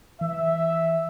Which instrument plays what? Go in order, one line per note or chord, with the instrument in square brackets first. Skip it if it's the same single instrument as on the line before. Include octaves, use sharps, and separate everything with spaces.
[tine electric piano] E3 [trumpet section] E5